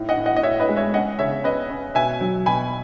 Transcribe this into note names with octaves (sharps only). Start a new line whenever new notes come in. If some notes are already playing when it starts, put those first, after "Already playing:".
Already playing: A2 D#4
D#5 F#5
A2
D#5 F#5
D#5
A2 C#5 E5
B4 D#5
G#3
C#5 E5
C#4 D#5 F#5
C#3 C#5 E5
C#4 B4 D#5
C#4
B2 E5 G#5
F#3
B2 G#5 B5